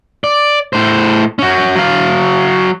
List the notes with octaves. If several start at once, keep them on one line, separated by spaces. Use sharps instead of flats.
D5
A2 C5
C#4 F#4
F#3 F5